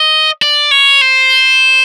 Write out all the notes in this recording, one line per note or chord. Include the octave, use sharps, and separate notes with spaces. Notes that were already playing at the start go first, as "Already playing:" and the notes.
Already playing: D#5
D5
C#5
C5